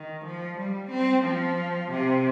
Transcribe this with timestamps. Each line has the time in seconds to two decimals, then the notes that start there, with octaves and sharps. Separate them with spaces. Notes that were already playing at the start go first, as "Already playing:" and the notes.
Already playing: D#3
0.25 F3
0.58 G3
0.91 C4
1.25 F3
1.91 C3